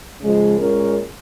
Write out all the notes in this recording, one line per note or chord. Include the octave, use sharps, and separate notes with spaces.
C#3 F3 G#3
A#2 G#3 C#4 A#4